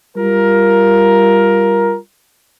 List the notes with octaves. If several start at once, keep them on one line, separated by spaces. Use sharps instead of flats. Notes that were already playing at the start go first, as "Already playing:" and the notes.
G3 F4 A#4